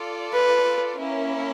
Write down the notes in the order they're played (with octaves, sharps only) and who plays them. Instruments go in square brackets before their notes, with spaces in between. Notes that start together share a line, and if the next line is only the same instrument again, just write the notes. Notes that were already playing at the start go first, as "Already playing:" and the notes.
Already playing: [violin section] F4 A4 D5
[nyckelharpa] B4
[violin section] A#3 C#4 E4